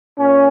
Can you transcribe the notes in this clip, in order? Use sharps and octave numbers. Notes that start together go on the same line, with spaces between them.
A#2 C#4